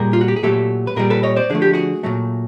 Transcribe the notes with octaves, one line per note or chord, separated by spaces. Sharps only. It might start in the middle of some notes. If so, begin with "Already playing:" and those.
Already playing: A#2 G3 G#4 A#4
F4
F#4
G4
G#4
A#2 F#3 A3 G4 A4
B4
A#2 G3 G#4 A#4
A4 B4
C#5 D#5
C5 D5
D3 F3 A3 G#4
G4
F#4 G#4
A#2 F#3 A3